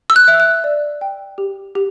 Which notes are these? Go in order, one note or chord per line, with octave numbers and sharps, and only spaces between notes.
E6
F#6
E5
F#6
D5
G5
G4
G4